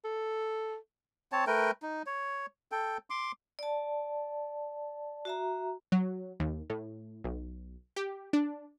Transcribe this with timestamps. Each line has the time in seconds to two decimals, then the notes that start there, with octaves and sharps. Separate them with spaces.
0.05 A4
1.32 C4 C#5 A5
1.47 A3 A#4 B4 G5
1.82 D#4
2.06 C#5
2.72 A4 G5
3.10 C6 D6
3.59 D5 A5
5.25 F#4 E5 A#5
5.92 F#3
6.40 D#2
6.70 A2
7.24 B1
7.96 G4
8.33 D4